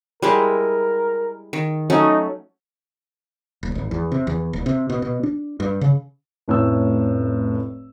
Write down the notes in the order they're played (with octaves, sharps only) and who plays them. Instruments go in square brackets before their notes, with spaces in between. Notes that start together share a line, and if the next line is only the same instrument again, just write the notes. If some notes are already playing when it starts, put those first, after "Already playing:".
[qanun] G3 G#3 E4 [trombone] A#4
[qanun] D#3
[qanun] F#3 A3 C#4 [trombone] D#4
[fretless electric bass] D#1
G#1
E2
C3
E2
D#1
C3
B2
B2
D4
G2
C#3
[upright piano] F1 A2 C#4 E6